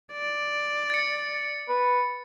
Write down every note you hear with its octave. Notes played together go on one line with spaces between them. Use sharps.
D5
A6 C#7
B4